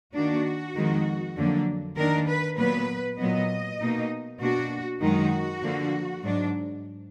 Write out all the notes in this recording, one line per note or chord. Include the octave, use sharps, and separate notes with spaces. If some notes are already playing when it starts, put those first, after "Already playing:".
D#3 A#3 D4 F#4
F2 D#3 G#3 D#4
F2 D3 F#3 A#3 D4
D#3 A#3 D4 A#4
B4
A#2 F#3 B3 B4
A#2 F#3 B3 D#5
B2 A#3 D#4
B2 A#3 D4 F#4
F#2 D#3 G#3 D#4 F#4
D3 F3 A#3
G#2 F#3 D4